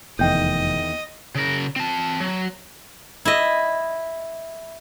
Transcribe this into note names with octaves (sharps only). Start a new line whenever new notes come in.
F1 E2 D#3 D#5 G5 G6
C#3 A#4
C4 A5
F#3
E4 D#5